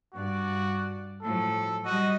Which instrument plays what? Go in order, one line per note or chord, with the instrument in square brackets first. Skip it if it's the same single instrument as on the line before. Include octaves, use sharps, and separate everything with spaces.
[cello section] G2 D5 [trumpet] F#4
[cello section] A2 F3 F#3 [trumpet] A4
[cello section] G3 D#5 [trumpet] F#4